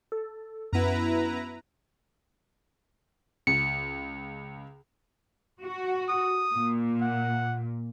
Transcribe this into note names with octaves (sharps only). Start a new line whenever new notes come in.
A4
F#2 B3 E4 B4 A#5
C#2 C#7
F#4
D#6
A#2
F#5